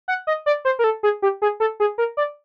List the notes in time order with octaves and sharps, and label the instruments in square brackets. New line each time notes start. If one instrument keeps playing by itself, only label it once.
[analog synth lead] F#5
D#5
D5
C5
A#4
A4
G#4
G4
G#4
A4
G#4
A#4
D5